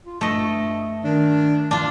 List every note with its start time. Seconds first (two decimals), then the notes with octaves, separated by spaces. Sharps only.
0.06 F4
0.21 G2 A3 D#5
1.04 D#3 D4
1.71 G2 D4 F4